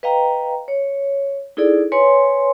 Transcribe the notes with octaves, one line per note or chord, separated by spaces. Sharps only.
B4 D#5 F5 G5 A#5
C#5
D#4 E4 G#4 A4 D5
B4 C#5 G#5 C6